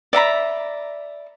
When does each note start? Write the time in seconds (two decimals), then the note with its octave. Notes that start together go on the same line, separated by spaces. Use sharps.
0.13 D5 E5 A#5 B5